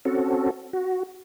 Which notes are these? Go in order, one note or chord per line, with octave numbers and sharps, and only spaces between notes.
C4 C#4 F#4 A4
F#4